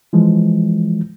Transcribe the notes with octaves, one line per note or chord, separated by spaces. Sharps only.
E3 F3 G#3